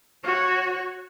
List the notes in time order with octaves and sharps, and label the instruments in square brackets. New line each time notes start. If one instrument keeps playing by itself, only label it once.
[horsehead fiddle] F#4 C#5